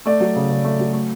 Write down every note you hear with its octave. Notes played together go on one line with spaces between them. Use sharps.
A3 D5
F#3
C#3
C#3
A3
F#3
A3